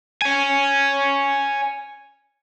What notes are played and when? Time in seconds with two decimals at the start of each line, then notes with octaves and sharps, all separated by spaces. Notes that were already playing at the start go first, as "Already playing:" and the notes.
0.22 C#5 G#5